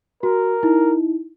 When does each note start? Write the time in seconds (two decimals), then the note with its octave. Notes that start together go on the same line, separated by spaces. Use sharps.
0.23 F#4 A#4
0.63 D#4 E4